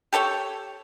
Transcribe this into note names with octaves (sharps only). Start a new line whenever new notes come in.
G4 A4 C#5 G5